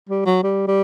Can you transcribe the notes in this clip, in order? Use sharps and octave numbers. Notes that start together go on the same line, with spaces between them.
G3
F#3
G3
G3